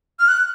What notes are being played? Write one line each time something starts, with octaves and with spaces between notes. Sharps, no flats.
F6
F#6